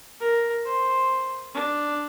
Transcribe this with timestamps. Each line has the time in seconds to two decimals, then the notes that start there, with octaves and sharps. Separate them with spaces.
0.20 A#4
0.65 C5
1.54 D4